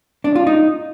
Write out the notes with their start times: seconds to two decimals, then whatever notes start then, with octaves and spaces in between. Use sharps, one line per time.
0.24 D4
0.35 F4
0.47 D#4